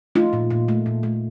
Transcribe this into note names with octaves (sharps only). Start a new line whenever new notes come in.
A3 D#4 F4
A#2
A#2
A3
A#2
A3